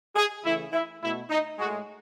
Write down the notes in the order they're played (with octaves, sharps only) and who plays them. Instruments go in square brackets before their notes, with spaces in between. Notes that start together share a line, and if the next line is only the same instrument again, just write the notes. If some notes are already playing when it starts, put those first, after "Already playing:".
[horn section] G#4
C#3 E3 A3 E4
E4
B2 A3 E4
D#4
A2 G#3 F#4